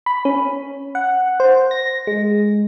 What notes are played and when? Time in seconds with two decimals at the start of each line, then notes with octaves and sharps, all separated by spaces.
0.06 B5
0.25 C#4
0.95 F#5
1.40 C5
1.71 A#6
2.07 G#3